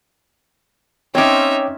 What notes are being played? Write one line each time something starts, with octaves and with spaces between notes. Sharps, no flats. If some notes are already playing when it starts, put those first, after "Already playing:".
C4 C#4 D#4 C#5 E5 G5 D6